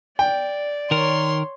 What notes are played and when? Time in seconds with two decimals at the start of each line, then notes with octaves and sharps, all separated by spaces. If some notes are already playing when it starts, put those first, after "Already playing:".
0.19 D5 G5
0.91 D#3 A#4 C#5 C6